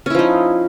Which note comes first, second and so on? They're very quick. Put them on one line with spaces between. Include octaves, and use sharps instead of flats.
C#4 E4 F3 D#4